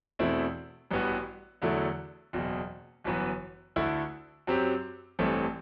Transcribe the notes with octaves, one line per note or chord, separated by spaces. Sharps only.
E2 B2 A3 C4 E4
A1 G2 E3 B3 F#4
E2 D3 F#3 A3 E4
F#1 E2 B2
G1 F#2 E3 B3 F#4
D2 D3 A3 E4
F#2 F#3 C4 G4
A1 G2 E3 A3 C4